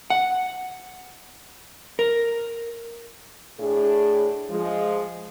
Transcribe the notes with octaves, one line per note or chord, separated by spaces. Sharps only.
F#5
A#4
A2 D4 G#4
F3 G#3